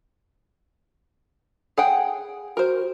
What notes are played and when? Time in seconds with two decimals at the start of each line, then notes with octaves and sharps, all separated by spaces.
1.78 G#4 F#5 G5
2.57 F#4 A#4 C5